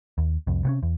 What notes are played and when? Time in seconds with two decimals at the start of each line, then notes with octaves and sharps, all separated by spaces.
0.18 D#2
0.47 C2 F2
0.65 C3 B3 C#4
0.83 E2